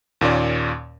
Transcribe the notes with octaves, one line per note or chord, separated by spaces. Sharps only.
D#2 A#2 C#4 D5